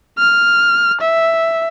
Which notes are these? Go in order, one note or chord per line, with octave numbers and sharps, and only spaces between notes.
F6
E5